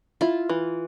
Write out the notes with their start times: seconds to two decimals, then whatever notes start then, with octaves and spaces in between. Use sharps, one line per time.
0.21 E4 F4
0.49 E3